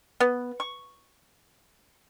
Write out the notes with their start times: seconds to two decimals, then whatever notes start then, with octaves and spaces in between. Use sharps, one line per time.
0.20 B3
0.60 C#6